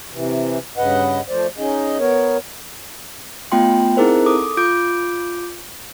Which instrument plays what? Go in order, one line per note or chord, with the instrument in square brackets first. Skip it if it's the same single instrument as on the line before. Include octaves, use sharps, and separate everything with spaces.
[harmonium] C3 E3
G2 C#3 B4 D#5 F#5
F3 A3 C5 D5
C#4 D#4 G#4 D#5
B3 A#4 C#5
[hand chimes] A3 B3 F4 G5 C6
C4 D#4 E4 G#4 A#4 C5
A4 D6 D#6
F4 D6 G6 D7